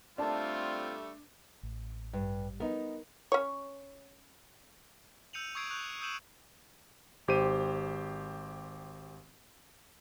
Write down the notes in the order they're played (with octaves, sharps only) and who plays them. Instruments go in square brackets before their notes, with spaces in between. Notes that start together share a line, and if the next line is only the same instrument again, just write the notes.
[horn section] G3 A3 [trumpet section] C4 F4 [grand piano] D4 [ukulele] A4 A#4 A5
[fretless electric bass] A1
[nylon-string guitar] G2
[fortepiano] B3 D#4 [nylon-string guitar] A#4
[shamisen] C#4 C#5
[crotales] E6 G6 C#7 D#7 F7 F#7
C#6 D#6 E6 G#6 C7 D7
C#6 D#6 F#6 G6 F7
D#6 E6 G6 D#7 E7 F#7
[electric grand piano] G#1 G4 C5 D#7